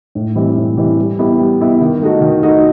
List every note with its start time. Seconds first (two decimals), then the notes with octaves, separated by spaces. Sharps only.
0.15 A2
0.35 E3 G3 C4 E4
0.57 A2
0.77 E3 G3 C4 E4
0.98 G3
1.19 B3 E4 G4
1.39 G3
1.60 B3 E4 G4
1.81 D#3
2.01 A3 D#4 F#4
2.21 D#3
2.42 A3 D#4 F#4